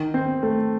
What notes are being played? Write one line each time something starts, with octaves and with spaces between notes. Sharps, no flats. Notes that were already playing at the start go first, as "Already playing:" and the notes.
Already playing: D#3
C4
A3